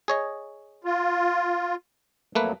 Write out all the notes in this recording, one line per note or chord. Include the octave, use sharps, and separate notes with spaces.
G#4 C#5 D#5
F4
F2 F#3 A3 A#3 B4